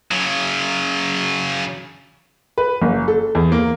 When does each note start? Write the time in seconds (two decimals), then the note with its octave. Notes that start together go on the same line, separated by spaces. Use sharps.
0.12 C#3 F#3
2.58 B4
2.82 F#1
3.08 A4
3.35 E2
3.52 A#3